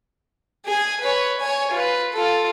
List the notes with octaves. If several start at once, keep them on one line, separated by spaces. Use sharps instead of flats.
G#4 G#5
B4 C#5
C#5 G#5
F4 B4
F4 A4